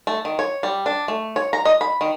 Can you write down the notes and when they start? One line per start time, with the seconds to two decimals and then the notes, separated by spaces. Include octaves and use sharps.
0.07 A3
0.25 D#3
0.39 C#5
0.63 G3
0.86 D4
1.08 A3
1.36 C#5
1.53 A#5
1.65 D#5
1.81 B5
2.01 D#3